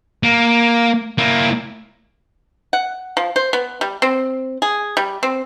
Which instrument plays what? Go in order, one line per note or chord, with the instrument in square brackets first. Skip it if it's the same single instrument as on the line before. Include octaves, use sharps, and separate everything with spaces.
[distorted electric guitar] A#3
A#3 E4
[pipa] F#5
F3
C5
B3
G3
C4
G#4
G3
C4